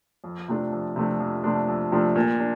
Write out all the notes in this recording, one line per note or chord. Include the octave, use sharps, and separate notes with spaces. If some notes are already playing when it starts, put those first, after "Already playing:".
F2
C3 F3 A3 D4
F2
C3 F3 A3 D4
F2
C3 F3 A3 D4
F2
C3 F3 A3 D4
A#2
D4